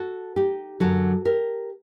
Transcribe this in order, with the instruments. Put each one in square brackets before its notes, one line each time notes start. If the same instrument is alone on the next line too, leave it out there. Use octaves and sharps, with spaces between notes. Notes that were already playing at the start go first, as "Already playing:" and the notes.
Already playing: [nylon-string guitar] F#4 A4
D#4 G4
F#2 D3 F#3 F#4 A4
G4 A#4